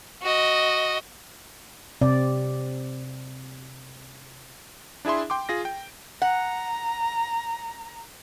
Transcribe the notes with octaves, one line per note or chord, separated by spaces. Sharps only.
F#4 D#5
C3 C4 D5
D4 E4 G#4 E5 C6
G5 C6 D6
F4 G#4 A#6
G5
F#5 A#5